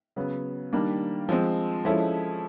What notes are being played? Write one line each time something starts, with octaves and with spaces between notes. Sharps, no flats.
C#3 F#3 B3
D#3 G3 A#3 D4
F3 G#3 C4
F3 G#3 C#4 E4 A4